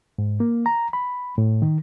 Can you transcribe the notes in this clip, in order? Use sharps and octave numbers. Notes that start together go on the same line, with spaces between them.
G#2
A#3
A#5
B5
A2
D#3